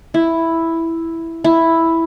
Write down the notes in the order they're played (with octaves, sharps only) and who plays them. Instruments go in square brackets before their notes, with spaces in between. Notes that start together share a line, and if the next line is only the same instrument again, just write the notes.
[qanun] E4
E4